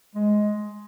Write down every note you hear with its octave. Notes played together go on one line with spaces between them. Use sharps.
G#3